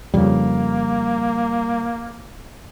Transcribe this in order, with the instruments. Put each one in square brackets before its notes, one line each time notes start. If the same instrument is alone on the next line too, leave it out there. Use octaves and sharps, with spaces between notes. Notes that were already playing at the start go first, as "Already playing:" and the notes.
[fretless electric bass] F2 C#3 [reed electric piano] G3 [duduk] A#3